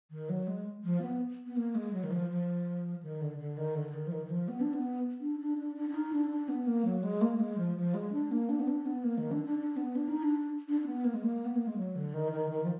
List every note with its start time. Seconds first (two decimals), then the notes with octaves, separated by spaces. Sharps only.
0.11 D#3
0.29 F#3
0.47 G#3
0.84 F3
1.02 B3
1.46 B3
1.56 A#3
1.75 G#3
1.93 F#3
2.03 D#3
2.11 F3
2.29 F3
3.03 D#3
3.21 D3
3.39 D3
3.57 D#3
3.75 D3
3.94 D#3
4.07 F3
4.12 D#3
4.25 D#3
4.30 F3
4.48 B3
4.61 D4
4.73 B3
5.21 D4
5.40 D4
5.58 D4
5.76 D4
5.89 D4
5.94 D#4
6.13 D4
6.30 D4
6.49 B3
6.66 A#3
6.85 F#3
7.03 G#3
7.21 A#3
7.40 G#3
7.58 F3
7.76 F3
7.94 G#3
8.13 D4
8.31 A#3
8.49 D4
8.60 B3
8.68 D4
8.86 B3
9.04 A#3
9.18 D#3
9.31 D4
9.45 D4
9.59 D4
9.77 B3
9.95 D4
10.09 D#4
10.23 D4
10.68 D4
10.80 D4
10.86 B3
11.04 A#3
11.14 G#3
11.24 A#3
11.45 B3
11.56 A#3
11.67 G#3
11.77 F#3
11.96 D3
12.14 D#3
12.32 D#3
12.51 D#3
12.64 F3